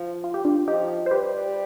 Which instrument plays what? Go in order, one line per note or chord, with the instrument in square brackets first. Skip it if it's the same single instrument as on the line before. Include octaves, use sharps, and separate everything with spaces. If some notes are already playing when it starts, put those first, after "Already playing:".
Already playing: [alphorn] F3
[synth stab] F4
G4
D4 F4
[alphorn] F3 [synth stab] D#4 G4
[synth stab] C5
[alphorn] G3 [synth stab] G4 B4